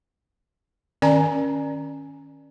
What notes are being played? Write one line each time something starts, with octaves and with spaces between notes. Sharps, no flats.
D#3 C#4 D5 G#5 A#5